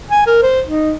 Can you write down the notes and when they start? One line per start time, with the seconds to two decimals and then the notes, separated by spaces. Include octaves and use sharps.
0.10 G#5
0.27 A#4
0.42 C5
0.67 D#4